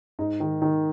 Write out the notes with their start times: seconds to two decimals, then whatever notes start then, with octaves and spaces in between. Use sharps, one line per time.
0.19 G#2 D#4
0.40 D#3
0.62 D#3